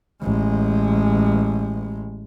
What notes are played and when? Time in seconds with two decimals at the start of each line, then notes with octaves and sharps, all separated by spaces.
0.23 A1 G#3